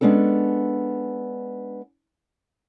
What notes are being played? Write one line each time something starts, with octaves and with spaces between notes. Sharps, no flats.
G#3 B3 C#4 D4 A4